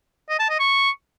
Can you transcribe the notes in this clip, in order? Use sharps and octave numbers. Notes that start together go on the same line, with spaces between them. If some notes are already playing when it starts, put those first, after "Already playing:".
D#5
A5
D#5
C#6